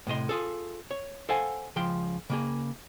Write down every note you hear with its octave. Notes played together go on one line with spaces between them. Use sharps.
A2 C3 D#5 C6
F4 G#4 A4
C#5
A4 C5 F5 F#5 G#5
C#2 F3 G5 C6
C#3 A#3 G#4